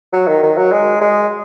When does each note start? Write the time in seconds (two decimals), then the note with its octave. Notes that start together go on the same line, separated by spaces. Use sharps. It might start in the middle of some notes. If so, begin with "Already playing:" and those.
0.13 F#3
0.27 D#3
0.43 D#3
0.57 F#3
0.72 G#3
1.01 G#3